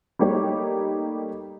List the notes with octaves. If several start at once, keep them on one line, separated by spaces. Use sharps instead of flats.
G3 A3 A#3 D#4 G4 C#5